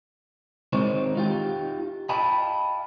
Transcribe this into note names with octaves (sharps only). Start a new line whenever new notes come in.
D#3 G#3 C4 D#4 C5 C#5
D#4 F4 G4
D#5 F5 G5 A5 B5